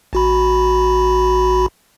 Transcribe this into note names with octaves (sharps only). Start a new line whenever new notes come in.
A1 F#4 B5